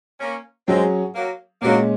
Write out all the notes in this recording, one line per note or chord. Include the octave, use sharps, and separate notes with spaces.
A#3 C#4
F#3 G#3 C4 C#4 G#4
F#3 A#3
A#2 F#3 G#3 A#3 C#4